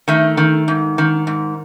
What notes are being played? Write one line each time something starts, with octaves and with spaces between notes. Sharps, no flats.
D#3 A3
D#3
G#2
D#3
G#2